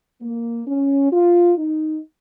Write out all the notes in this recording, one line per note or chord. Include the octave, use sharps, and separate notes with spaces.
A#3
C#4
F4
D#4